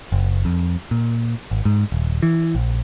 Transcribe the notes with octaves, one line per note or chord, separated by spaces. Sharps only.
F#1
F2
A#2
G#1
G#2
D#1
E3
A#1